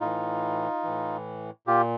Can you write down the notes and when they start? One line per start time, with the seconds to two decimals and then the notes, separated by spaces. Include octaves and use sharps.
0.01 A2 E3 D#4 F4
0.84 A2 E3
1.67 A#2 F4 G4